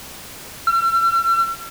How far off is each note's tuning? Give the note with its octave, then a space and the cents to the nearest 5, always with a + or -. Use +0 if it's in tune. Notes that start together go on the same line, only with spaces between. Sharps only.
E6 +45